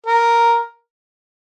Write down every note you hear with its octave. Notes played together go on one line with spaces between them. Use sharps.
A#4